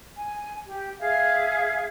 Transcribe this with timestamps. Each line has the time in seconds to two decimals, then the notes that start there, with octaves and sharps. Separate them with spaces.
0.17 G#5
0.67 G4
1.01 G#4 E5 F5